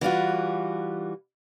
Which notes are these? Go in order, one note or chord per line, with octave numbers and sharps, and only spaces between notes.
E3 G3 F4 F#4